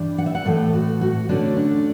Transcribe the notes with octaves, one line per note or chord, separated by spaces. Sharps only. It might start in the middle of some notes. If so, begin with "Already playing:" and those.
Already playing: G2 E3 G3 D4
F#5
E5
F#5
A2 E3 A3 A4
F#4
F#4
D3 A3 C#4 D4
D4